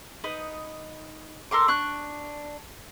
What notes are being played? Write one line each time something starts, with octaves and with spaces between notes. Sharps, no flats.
D#4 B4 D#6
A4 A#4 C6 D6
D4 C#6 F#6